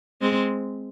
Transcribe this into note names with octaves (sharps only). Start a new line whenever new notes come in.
G#3 C4